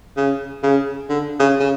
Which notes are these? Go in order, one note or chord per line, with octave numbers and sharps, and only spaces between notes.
C#3
C#3
D3
C#3
C#3